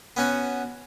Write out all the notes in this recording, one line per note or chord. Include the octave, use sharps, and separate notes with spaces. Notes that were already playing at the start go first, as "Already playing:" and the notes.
B3 C#4 F#4